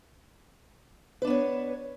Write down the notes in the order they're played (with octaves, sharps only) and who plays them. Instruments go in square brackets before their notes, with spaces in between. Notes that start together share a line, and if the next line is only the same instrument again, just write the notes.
[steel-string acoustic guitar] B4
D4
B3
C#5